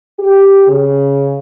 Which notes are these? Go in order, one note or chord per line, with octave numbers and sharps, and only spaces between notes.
G4
C#3